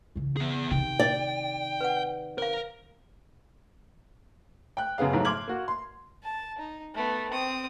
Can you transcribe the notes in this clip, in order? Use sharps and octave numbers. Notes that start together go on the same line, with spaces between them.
C#3 E3
B3 G#4
C3 D#3 G5
D5
B4 F#5
A#4 C5 F5
G5 F#6
F#2 C#3 B3 G#4 F5
G#2 F3 F#3 A3
C6 D6 F6 G#6 F#7
A#3 F#4
C6
A5
D#4
A3 B3
C4 D#6